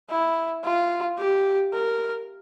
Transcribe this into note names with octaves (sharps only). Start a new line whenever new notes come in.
E4
F4
G4
A#4